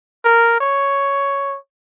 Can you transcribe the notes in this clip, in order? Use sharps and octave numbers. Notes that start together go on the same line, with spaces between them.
A#4
C#5